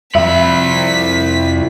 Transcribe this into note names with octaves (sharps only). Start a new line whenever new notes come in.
C2 F2 E5 B5 B6